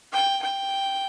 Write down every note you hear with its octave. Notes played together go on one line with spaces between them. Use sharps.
G5
G5